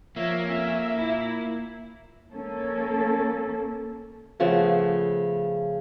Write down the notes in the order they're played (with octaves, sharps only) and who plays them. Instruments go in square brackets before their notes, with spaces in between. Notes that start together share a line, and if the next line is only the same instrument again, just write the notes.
[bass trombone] F3 [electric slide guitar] A#3 [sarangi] C#5 [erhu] E5
[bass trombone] F2 [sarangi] C#4 [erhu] E5
[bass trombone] A#2 [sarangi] E4
[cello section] A#3 C#4 A4
[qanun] C#3 F3 A3 B3